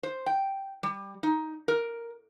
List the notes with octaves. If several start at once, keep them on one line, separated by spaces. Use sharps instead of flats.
C5
G5
G3
D#4
A#4